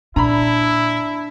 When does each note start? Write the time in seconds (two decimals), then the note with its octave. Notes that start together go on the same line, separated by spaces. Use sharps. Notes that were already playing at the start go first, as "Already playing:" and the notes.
0.16 A#2 D4 E4 A#5 B5